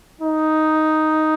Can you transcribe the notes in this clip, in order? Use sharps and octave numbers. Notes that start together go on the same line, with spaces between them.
D#4